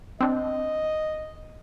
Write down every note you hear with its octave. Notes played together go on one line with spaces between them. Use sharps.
C4 D4 D#5